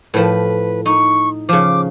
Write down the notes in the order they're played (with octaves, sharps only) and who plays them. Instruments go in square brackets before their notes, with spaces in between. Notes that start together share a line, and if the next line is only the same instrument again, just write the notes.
[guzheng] A2 F3 [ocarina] B4
[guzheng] D#4 [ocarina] C#6
[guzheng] C#3 F3 [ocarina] D6